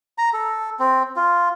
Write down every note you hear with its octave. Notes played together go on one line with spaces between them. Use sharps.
A#5
A4
C4
F4